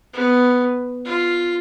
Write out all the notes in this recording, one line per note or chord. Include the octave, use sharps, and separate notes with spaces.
B3
F4